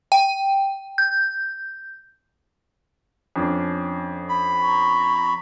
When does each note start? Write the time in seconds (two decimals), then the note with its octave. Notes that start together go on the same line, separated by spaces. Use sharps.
0.12 G5
0.98 G6
3.36 F2 C#4 D4
4.29 B5
4.61 A#5 C#6